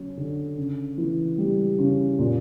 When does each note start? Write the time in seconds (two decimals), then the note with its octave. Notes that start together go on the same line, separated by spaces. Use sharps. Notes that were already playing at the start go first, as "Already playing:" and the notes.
Already playing: F#3 C#4
0.17 D3
0.57 C#3
0.98 E3
1.38 G3
1.79 C#3
2.19 A#2